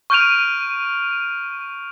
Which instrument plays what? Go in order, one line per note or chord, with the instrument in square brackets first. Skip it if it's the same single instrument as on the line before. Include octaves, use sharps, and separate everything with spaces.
[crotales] C#6 F6 G6 D7 D#7 F7